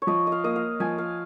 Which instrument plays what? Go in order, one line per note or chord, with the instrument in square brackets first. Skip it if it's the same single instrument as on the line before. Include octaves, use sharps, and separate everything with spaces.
[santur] C#5
[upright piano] F3 [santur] D#5
[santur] D#5
F5
[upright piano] A#3 [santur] D#5
[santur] F5
[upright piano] F3 [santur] G#5
[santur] F5